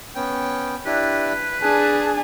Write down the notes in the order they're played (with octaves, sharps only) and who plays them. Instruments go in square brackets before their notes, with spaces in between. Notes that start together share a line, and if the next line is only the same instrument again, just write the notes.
[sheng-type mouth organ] B3 C#4 G5
[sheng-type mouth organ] D4 E4 G4 [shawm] B4
[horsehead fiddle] D4 G#4 [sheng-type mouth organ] A5